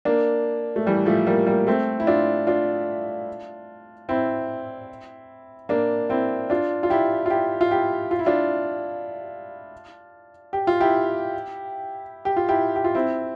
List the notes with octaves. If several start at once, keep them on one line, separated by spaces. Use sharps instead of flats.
A#3 D4
A3
E3 G3
F3 A3
G3 A#3
G3 A#3
A3 C4
E4
D4 F4
D4 F4
C4 E4
A#3 D4
C4 E4
D4 F4
F4
E4 G4
F4
E4 G4
F4
E4 G4
F4
E4
D4 F4
G4
F4
E4 G4
G4
F4
E4 G4
G4
F4
C4 E4